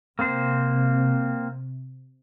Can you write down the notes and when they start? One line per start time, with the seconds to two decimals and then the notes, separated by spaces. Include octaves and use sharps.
0.19 C3 A#3 C4 C5